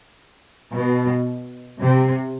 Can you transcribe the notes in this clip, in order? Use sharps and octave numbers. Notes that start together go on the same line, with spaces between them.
B2
C3